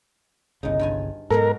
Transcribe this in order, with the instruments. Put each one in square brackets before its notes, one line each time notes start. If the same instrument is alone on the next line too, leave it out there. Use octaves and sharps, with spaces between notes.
[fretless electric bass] G1 C2 C#3 [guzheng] F#2 D#4
[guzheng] G2 F4 G#5
[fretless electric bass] G#2 B3 [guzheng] B2 F#3 F#5 [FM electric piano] A4 [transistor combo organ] A#4